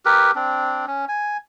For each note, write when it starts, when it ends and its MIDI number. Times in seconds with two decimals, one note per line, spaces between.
0.05 0.32 67
0.05 0.32 70
0.05 0.32 71
0.35 0.86 60
0.35 0.86 62
0.88 1.05 61
1.09 1.37 80